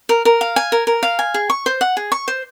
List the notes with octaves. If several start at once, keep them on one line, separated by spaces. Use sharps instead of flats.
A#4
A#4
F5
G#5
A#4
A#4
F5
G#5
G#4
C#6
C5
F#5
G#4
C#6
C5